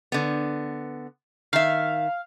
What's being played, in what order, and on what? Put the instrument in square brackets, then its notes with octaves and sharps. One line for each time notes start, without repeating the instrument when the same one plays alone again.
[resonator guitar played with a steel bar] D3 B3
[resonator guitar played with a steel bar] D#3 E5 [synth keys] F5